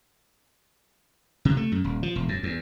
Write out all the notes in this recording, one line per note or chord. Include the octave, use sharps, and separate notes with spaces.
C3
A3
F#2
D#1
F3
E1
F#2
E2